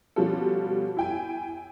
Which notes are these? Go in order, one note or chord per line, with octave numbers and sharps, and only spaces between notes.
B2 F3 G3 C#4 F4 A4
E4 G5 G#5